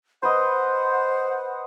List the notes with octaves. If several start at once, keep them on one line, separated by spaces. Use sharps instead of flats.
B4 C5 D#5 F#5